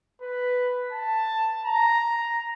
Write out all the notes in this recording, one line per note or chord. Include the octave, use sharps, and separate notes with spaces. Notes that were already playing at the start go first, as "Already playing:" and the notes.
B4
A5
A#5